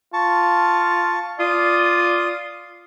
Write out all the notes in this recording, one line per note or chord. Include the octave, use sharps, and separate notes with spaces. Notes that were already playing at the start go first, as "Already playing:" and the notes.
F4 A5 C#6
F4 D5 D#6